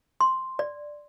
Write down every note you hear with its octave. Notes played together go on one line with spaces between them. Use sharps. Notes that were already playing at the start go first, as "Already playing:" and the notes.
C6
D5